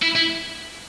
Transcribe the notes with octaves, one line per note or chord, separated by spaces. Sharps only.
E4
E4